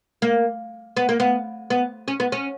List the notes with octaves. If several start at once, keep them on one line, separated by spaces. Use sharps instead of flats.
A#3
B3
A#3
B3
B3
C#4
B3
C#4